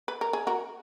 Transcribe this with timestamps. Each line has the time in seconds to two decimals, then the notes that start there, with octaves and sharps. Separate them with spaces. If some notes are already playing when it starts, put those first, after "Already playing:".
0.08 B4
0.21 A#4
0.33 G#4
0.47 F#4 A#4